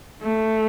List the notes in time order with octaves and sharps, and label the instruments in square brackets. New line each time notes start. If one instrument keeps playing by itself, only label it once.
[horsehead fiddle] A3